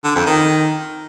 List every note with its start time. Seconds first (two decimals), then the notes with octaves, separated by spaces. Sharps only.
0.04 D3
0.15 F2
0.26 D#3